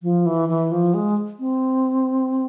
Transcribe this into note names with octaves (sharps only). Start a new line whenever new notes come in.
F3
E3
E3
F3
G#3
C4